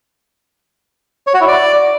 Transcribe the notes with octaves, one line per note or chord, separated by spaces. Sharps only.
C#5
F#4
E4
D5